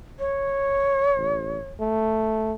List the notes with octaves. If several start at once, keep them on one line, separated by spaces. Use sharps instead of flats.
C#5
A1
A3